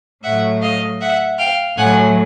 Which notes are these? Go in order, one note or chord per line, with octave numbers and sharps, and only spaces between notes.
A2 F#3 E5 F#5
D#5 F5
E5 F#5
F5 G5
A2 F#3 F#5 G#5